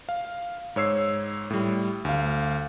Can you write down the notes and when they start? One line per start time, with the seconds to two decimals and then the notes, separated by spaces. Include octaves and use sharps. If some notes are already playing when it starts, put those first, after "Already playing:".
0.09 F5
0.76 G#2 C#5 E6 C7
1.50 A2 G3
2.05 D2 F5